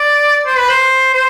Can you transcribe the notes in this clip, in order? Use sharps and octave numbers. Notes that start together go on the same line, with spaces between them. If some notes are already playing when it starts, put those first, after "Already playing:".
Already playing: D5
C5
B4
C5
C5